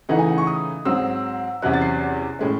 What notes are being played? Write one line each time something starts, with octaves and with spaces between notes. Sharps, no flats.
C#3 E3 A3 D#4 F#5
G#5
F#5
C#6
D#6
G#2 F#3 C4 E6
E2 C3 F#3 C#4 F#6
A6
C7
A2 G#3 C#4